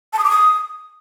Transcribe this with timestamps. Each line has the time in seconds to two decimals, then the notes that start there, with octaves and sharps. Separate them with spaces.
0.13 A5
0.19 D#6
0.24 D6
0.30 D#6